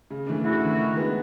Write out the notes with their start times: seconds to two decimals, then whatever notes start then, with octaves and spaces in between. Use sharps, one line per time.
0.11 C#3
0.27 E3 A3 D4
0.44 C#3 E4 F#4
0.61 E3 A3 D4
0.79 D#3
0.96 G#3 B3 D4 F#4